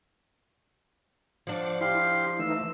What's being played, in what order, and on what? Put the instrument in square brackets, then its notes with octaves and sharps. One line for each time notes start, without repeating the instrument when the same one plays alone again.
[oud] F3 D4 [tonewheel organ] F#5 D6
[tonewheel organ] E4 [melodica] G4 F5 C6
[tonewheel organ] E3 A3 D#4 [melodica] E6